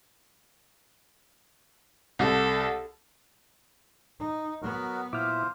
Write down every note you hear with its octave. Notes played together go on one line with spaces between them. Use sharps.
C2 A4
D#4
F#3 B3 F#4 A#4
A#2 E4 F4 C5 E5 D6 F6